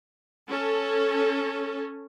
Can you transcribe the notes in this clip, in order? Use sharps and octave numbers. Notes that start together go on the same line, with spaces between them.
C#4 A4